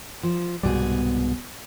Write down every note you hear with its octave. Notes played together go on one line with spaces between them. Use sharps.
F3
C2 G#2 B2 G3 G#4